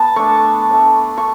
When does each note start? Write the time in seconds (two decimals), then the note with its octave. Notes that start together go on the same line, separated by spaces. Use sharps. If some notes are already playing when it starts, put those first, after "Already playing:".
Already playing: B3 A5
0.16 A3 D4 C#6
0.71 A3 D4
1.17 C#6